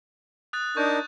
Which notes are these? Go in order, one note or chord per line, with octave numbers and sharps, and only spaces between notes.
D#6 F#6 A6
D4 D#4 A#4 C#6 G6